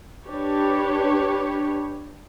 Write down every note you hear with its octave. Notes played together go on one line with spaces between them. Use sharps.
D4 G4 B4 C#5